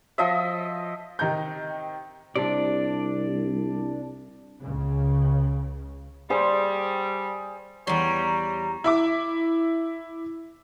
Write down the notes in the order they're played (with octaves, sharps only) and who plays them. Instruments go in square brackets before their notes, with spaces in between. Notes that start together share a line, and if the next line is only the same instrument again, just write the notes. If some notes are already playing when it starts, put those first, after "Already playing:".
[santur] F3 D#5 E5
[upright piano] C3 D#3 D#4 A#5 G6
[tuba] C2 [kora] C3 [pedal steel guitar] D4 D5
[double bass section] C#2 C#3
[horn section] G3 [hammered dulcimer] G#4 C5
[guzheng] E2 C6 [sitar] G3 [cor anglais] C#5 [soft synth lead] A#5
[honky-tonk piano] E4 E5 D6